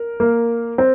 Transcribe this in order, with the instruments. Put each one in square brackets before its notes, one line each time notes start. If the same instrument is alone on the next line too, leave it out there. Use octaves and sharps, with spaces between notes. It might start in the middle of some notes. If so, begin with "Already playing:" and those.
Already playing: [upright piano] A#4
[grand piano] A#3
C4